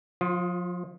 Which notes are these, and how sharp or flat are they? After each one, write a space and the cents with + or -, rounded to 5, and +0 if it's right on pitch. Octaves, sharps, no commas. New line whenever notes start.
F3 +35 F4 +0